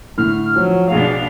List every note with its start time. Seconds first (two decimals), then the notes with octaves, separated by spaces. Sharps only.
0.18 A2 D3 F6
0.56 F3 F#3
0.91 B1 B2 D4 G#4 F5